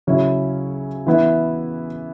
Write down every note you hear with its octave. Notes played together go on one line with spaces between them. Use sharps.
C#3 F#3 C#4 E4
E3 B3 E4